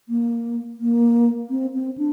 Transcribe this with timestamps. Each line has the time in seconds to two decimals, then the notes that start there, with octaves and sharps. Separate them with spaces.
0.09 A#3
0.80 A#3
1.50 C4
1.74 C4
1.98 D4